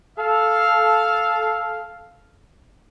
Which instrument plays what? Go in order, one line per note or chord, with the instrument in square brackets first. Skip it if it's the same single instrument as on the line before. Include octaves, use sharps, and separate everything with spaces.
[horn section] A4 F5